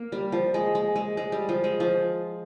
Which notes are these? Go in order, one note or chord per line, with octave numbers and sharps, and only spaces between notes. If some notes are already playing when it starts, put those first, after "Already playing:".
Already playing: A#3
G3
F3
G#3
G#3
G#3
G#3
G3
F3
G#3
F3